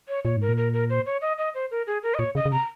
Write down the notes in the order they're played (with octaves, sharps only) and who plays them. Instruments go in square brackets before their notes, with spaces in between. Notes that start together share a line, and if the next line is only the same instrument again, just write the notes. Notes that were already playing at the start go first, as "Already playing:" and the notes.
[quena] C#5
[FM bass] A#2 [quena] C#5
[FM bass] G#2 [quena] A#4
[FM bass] A#2
[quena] A#4
A#4
C5
C#5
D#5
D#5
C5
A#4
G#4
A#4
D#5
[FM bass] A#2 [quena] C#5
[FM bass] C#3 [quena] D#5
[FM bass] C#3
[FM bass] C3 [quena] A#5